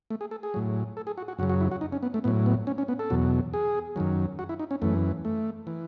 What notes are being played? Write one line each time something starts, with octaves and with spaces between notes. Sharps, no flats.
A3
G#4
A4
G#4
A2 F#3
A4
G#4
F#4
F#4
F#2 C#3 F#3 F#4
F#4
E4
F#4
D#4
C#4
B3
A3
A2 F#3 B3
B3
C#4
C#4
B3
A4
E2 B2 F#3
G#4
F#2 D#3 F#3
F#4
E4
D#4
C#4
F#2 E3 A3
A3
E3